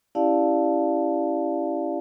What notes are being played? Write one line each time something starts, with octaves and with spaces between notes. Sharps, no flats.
C#4 E4 G4 D5 F5 A5